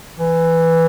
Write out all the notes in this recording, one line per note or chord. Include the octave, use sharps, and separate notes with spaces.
E3